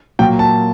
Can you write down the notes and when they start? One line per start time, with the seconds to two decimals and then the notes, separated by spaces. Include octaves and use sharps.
0.19 A#2 F#3 A#3 G5
0.39 A5